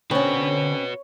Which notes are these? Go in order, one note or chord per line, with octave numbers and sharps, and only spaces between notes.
D3 C4 C#4 F#4 B4 C#5